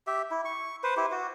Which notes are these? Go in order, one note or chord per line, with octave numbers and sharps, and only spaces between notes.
G4 E5
E4
C#6
B4 C5
E4 G4
F#4